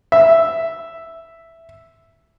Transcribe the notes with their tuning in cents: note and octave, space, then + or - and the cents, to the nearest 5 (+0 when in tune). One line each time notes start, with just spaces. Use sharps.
E5 +0